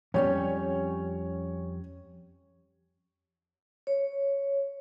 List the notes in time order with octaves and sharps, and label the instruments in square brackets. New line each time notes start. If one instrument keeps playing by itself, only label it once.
[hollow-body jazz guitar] F2 G3 C#4 [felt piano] C#5
[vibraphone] C#5